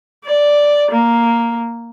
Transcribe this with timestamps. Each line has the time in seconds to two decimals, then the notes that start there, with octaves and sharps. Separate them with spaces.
0.25 D5
0.91 A#3